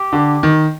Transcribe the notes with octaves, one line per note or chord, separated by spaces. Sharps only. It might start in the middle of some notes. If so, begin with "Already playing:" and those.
Already playing: G4
D3
D#3